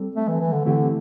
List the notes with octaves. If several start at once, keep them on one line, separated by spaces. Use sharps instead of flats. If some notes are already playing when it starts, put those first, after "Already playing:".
Already playing: G3 C4 A4
A3
E3
E3
D3
D3 E3 A3 C4 E4 G4